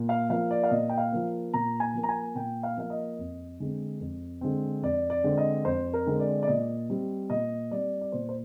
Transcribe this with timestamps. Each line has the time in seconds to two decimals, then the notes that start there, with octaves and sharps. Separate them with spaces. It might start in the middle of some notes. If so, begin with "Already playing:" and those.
Already playing: A#2
0.09 F5
0.29 F3 A#3 F5
0.51 D5
0.64 F5
0.70 A#2 D#5
0.89 G5
0.98 F5
1.12 F3 A#3
1.54 A#2 A#5
1.80 G#5
1.94 F3 A#3
2.03 A#5
2.09 G#5
2.35 A#2 G5
2.63 F5
2.77 F3 A#3 F5
2.90 D#5
3.19 F2
3.60 D3 G#3 C4
4.00 F2
4.41 D3 G#3 C4
4.82 F2 D5
5.10 D5
5.24 D3 G#3 C4
5.38 D#5
5.65 F2 C5
5.93 A#4
6.06 D3 G#3 C4
6.20 D5
6.43 D5
6.48 A#2 D#5
6.90 G3 C4
7.30 A#2 D#5
7.71 G3 C4 D5
8.01 D5
8.12 A#2 C5
8.29 C5